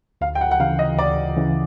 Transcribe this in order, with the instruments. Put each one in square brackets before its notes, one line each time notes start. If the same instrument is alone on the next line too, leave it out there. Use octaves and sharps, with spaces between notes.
[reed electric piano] D2 [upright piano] F5
[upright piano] G5
F#5
F#5
[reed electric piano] C#3 E3 [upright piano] F5
[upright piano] D#5
[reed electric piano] D2 [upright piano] D5
[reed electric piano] C#3 E3